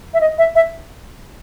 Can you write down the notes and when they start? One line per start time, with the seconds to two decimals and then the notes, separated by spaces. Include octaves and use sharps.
0.14 E5
0.21 D#5
0.38 E5
0.55 E5